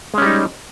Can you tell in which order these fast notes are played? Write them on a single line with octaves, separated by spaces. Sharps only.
G#3 C#4 G3 D#4